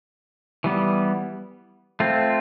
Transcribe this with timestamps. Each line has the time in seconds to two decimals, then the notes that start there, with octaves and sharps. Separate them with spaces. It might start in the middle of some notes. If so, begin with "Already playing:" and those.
0.64 E3 G3 B3
2.00 A3 C4 F4